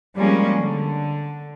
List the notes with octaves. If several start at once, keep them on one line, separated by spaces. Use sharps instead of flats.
F3 G3 G#3 A#3 C#4
D3